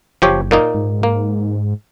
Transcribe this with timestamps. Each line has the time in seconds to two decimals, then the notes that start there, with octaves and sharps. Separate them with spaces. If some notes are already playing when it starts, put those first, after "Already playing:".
0.22 F#1 F3 G4 C#5
0.51 A#2 A#3 D#4
0.74 G#2
1.03 A#3